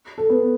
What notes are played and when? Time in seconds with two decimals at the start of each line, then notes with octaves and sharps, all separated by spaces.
0.18 A4
0.30 B3